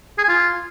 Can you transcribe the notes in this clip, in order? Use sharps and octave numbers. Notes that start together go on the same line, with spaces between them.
G#4
G#5
F4